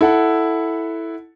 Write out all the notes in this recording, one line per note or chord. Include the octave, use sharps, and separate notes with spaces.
E4 A4 F#5